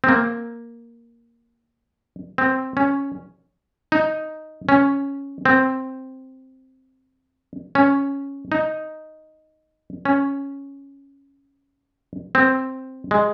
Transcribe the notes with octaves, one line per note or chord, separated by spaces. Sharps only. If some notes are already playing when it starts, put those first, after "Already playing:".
C4
A#3
C4
C#4
D#4
C#4
C4
C#4
D#4
C#4
C4
G#3